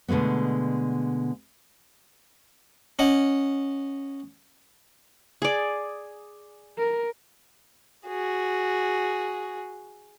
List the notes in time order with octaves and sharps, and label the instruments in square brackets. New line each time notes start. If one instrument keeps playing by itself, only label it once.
[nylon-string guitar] B2 D3 G#3 A3 B3
[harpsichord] C#4 D#5 F#5
[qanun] G#4 D5
[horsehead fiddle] A#4
[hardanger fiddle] F#4 G#4